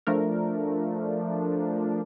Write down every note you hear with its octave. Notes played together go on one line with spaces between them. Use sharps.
F3 A3 D4 A#4